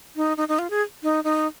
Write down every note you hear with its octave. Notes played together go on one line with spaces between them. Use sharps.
D#4
D#4
D#4
F4
G#4
D#4
D#4